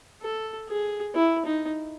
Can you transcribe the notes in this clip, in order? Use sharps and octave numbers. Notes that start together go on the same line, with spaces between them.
A4
G#4
E4
D#4